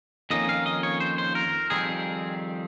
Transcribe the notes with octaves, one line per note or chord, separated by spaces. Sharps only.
F2 D#3 A#3 C#4 D#5
F5
D#5
C#5
C5
C5
A#4
F2 D#3 G3 C4 G#4